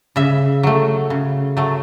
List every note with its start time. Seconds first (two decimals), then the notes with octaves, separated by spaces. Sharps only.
0.16 C#3 E5
0.63 F#3 A3
1.10 C#3
1.57 F#3 A3